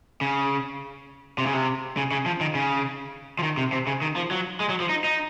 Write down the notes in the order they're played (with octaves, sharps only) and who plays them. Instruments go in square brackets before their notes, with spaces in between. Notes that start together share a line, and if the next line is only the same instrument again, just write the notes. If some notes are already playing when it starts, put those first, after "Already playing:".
[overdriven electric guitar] C#3
C3
C#3
C3
C#3
C#3
F3
D#3
C#3
F3
D#3
C3
C3
C#3
D#3
F3
F#3
G#3
F#3
F3
D#4
D#4